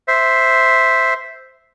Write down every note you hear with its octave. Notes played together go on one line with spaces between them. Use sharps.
C5 E5